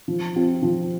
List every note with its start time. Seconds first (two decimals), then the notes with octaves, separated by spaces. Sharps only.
0.08 F3
0.36 C4 F4
0.62 F3